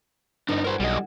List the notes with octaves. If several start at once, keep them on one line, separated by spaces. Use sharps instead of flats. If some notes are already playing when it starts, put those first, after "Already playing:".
G1 D4 D#4
E4 F#4 A#4 C5 G#5
B1 G3 D#5